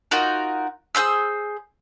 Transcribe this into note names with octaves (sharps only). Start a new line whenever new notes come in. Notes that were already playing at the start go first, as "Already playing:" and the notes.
D#4 F4 F#4 A#4
G#4 C5 C6 E6